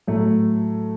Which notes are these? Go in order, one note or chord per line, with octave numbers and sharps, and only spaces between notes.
A2 F#3 A3